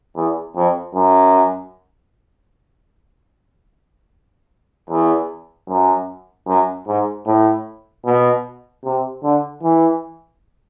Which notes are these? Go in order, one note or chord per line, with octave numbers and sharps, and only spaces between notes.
E2
F2
F#2
E2
F#2
F#2
G#2
A2
B2
C3
D3
E3